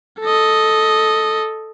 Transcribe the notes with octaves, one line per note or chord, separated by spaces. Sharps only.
A4 D#5